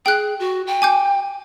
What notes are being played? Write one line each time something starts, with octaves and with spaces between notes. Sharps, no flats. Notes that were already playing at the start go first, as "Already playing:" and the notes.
G#4 G5 F#6
F#4
G5
G#5 D6 G6